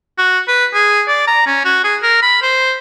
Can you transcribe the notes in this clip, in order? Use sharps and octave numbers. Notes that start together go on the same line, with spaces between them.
F#4
B4
G#4
D5
A#5
C#4
F#4
G#4
A#4
B5
C5